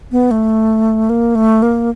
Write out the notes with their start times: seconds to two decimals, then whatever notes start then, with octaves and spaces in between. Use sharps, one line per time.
0.12 B3
0.31 A3
1.10 A#3
1.35 A3
1.62 A#3